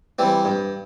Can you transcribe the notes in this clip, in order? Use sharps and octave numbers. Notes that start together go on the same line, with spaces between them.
E3 G3 C4
G2